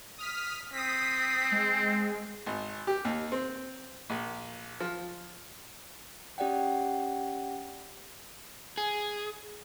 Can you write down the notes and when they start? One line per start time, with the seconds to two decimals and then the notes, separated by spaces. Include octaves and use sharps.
0.18 D#6 F6 B6
0.73 C4 D#6 B6
1.52 G#3
2.46 G#1
2.87 G4
3.05 D#2
3.32 C4
4.10 A#1
4.80 F3
6.38 C#4 G4 D5 F#5 G5
8.78 G#4